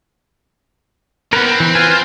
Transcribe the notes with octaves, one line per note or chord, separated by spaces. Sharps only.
E3 B3 C#4 A#4 B4
C4
E3
F4 B4 G#5
F4